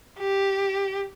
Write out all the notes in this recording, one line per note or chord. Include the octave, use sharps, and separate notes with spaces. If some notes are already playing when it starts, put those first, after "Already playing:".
G4